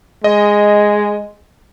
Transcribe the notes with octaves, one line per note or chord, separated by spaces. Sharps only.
G#3 D#5